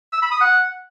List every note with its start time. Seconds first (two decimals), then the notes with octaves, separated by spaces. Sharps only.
0.13 E6
0.22 B5
0.32 D#6
0.41 F#5